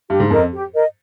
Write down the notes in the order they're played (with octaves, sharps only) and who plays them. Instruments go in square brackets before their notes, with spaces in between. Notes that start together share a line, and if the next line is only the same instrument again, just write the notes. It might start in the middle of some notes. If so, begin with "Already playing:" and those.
[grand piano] G2 [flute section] G4
[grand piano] G#2
[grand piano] F2 [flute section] A#4 D#5
[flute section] G4
A#4 D#5